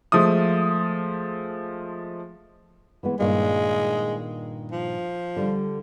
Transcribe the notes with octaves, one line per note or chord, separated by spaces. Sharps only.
F3 G#3 A3 D#6
E3 G#3 B3
G2 A#2 D#3 G#3
F3
D3 G3